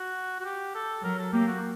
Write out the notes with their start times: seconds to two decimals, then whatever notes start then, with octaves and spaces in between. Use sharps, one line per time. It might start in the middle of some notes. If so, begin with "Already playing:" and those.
Already playing: F#4
0.40 F#4
0.45 G4
0.75 A4
1.04 F#3 A#4
1.19 A4
1.33 A#3 G4
1.47 F#4